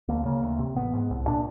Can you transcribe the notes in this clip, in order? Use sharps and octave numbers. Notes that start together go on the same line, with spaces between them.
D2 A#3
C#3 A#3
D2
C3
A1 B3
G#2
C2
A#2 D4